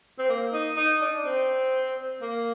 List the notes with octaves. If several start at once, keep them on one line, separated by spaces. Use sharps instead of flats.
C4
A#3
D#4
D#4
D4
C4
A#3